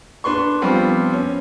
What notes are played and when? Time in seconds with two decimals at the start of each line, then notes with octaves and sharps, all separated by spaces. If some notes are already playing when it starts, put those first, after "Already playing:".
0.24 D4 B4 C6 C#6
0.62 F3 G3 B3 C4
1.13 C#4